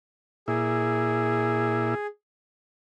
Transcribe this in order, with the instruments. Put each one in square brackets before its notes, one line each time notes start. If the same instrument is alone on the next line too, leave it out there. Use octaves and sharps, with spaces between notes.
[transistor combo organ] A#2 E4 [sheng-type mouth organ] G#4